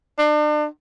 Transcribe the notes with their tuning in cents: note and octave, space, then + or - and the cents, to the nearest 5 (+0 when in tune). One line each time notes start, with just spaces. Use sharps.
D4 +40